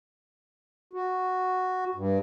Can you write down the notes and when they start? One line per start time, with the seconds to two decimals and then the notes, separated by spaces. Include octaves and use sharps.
0.93 F#4
1.95 G2